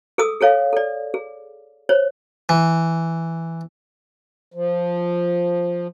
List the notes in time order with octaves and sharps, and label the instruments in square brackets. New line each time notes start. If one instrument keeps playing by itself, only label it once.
[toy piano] G#4 A4 D#6 E6
G#4 A4 C#5 F5
A4 D5
G#4
C5 C#5
[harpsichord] E3
[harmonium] F3